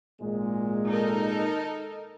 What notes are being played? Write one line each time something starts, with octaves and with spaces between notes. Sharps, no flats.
G#1 A#2 G#3
D#4 A4 A#4